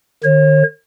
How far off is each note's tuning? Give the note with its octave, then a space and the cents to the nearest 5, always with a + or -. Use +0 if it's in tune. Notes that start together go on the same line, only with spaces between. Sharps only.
D#3 -40 C#5 -40